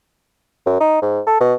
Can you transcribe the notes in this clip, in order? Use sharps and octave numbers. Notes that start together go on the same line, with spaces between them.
F#2
D#4
G#2
A4
B2